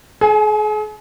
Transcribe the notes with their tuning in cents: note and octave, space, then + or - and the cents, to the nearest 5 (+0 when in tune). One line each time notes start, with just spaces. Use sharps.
G#4 +40 G#5 +5